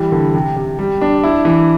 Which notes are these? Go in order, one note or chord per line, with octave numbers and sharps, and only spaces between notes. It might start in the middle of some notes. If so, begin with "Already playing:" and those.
Already playing: E3 G3
D3
C3
C3
G3
D4
E4
E3